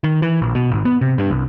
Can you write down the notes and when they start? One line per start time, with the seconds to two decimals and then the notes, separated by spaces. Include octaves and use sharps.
0.04 D#3
0.22 E3
0.42 A#1
0.55 B2
0.71 G#1
0.85 B3
1.01 C3
1.18 G2
1.31 C2